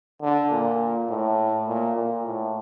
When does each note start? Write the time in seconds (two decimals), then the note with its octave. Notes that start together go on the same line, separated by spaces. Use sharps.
0.22 D3
0.51 A#2
1.09 A2
1.67 A#2
1.96 A#2
2.25 A2